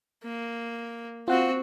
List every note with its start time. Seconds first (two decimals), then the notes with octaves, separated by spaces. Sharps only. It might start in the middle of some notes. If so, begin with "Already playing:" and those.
0.24 A#3
1.28 C4 F4 F#4 F#5